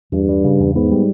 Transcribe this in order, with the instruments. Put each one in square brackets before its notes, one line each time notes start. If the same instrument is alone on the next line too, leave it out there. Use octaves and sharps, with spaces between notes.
[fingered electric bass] E2 [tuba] G2
[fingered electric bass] G3
C#3
E2
[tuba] G#2 [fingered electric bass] B3
[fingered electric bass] G3